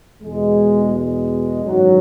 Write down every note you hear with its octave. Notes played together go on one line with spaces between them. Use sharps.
E2 B2 G#3
G#3
G#1 F#2 E3 F#3